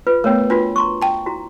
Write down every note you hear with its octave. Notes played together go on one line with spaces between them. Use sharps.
F4 B4
A3 B3 A#4 C#5 G5
D4 F4 F#4 B4
A#5 C6 C#6
G5 A5
E4 F#4 A#5